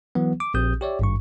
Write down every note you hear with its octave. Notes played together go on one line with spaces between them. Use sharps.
E3 F#3 B3
D6
A#1 C4 G4 D#6 G6
G4 C#5 D5 E5
G#1 G2 C#6